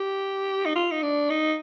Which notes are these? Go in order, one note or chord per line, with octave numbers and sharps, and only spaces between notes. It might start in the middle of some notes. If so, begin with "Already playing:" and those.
Already playing: G4
D#4
F4
D#4
D4
D#4